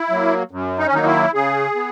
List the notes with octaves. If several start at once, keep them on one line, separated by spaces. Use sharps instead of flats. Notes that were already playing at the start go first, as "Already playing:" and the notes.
Already playing: E4
F#3 A#3
F#2
D#4
C#4
D#3 F#3 A#3 D#4
E4
C#3 G#4
B3